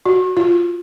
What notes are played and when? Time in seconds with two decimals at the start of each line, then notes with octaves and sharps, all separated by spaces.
0.06 F#4
0.37 F4